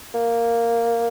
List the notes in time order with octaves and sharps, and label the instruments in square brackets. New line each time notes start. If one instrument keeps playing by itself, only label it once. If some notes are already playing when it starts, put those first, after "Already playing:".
[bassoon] A#3